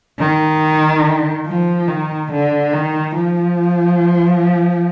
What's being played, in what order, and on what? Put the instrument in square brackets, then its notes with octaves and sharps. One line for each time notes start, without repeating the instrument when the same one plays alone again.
[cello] D#3
F3
D#3
D3
D#3
F3